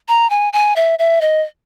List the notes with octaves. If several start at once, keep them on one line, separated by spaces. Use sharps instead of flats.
A#5
G#5
G#5
E5
E5
D#5